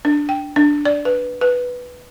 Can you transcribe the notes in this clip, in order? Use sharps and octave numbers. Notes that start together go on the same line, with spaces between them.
D4
G5
D4
D5
B4
B4